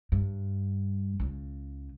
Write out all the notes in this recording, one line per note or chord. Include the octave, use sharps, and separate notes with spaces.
G2
C#2 C#3